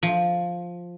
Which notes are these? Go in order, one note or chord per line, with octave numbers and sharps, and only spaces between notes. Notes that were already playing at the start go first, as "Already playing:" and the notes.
F3